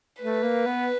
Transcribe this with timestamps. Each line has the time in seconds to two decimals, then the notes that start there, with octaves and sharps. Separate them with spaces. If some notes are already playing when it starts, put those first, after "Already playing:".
0.22 A3 B4
0.43 A#3
0.66 B3